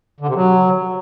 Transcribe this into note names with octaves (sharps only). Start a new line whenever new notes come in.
D3
C3
F#3